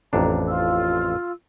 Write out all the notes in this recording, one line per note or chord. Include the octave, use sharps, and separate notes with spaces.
A1 F2 D4 A#5
F4 E6